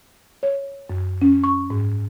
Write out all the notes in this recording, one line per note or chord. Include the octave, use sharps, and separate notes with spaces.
C#5
F#2
C#4
C#6
G#2